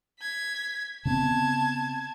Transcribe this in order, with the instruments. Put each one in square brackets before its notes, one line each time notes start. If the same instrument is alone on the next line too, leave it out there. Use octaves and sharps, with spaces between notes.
[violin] G#6 B6
[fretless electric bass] C#3 B3 C4 [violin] A5 G#6